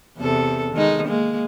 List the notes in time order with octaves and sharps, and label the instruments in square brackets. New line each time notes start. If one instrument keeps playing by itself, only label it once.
[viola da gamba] E2 C3 A4
D#3 G#3 D#4
G#3 A#3